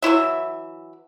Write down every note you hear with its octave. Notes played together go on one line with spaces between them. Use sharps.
E3 F#3 E4 E5